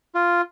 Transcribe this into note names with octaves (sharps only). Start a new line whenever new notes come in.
F4